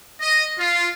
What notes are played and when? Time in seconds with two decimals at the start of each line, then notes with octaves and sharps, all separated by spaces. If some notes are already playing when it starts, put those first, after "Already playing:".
0.20 D#5
0.58 F4